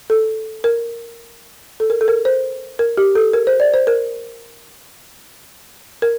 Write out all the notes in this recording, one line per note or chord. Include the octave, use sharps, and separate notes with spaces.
A4
A#4
A4
A#4
A4
A#4
C5
A#4
G4
A4
A#4
C5
D5
C5
A#4
A#4